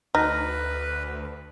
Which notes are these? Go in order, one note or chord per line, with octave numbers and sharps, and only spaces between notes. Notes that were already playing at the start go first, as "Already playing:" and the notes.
D2 D#4 B4 F6 A#6